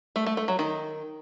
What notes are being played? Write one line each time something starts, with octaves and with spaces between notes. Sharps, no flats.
A3
A3
A3
F#3
D#3